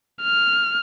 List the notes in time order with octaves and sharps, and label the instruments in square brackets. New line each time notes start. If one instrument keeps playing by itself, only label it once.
[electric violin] F6